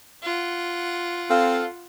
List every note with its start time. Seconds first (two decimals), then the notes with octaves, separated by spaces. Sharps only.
0.22 F4 F#5
1.30 C4 A4 F5